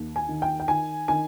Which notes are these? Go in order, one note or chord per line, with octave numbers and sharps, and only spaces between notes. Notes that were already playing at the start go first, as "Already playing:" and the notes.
Already playing: D#2
G#5
D#3
G5
G5
D#3 G#5
D#3 G#5